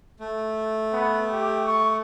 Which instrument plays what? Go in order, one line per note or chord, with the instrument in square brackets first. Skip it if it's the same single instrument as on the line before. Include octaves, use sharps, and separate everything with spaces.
[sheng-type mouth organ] A3
[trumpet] B3
G4
C#6